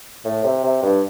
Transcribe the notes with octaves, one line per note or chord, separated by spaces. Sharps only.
A2
C3
C3
G2